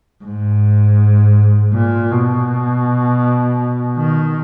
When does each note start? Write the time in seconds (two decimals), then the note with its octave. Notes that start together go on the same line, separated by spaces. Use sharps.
0.24 G#2
1.74 A#2
2.12 B2
3.97 D#3